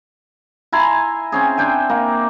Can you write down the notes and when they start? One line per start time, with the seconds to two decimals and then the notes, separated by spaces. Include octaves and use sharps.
0.72 E4 G#5 A#5 C6
1.32 C4 C#4 G#4
1.57 D4 C5 G5 G#5
1.89 A#3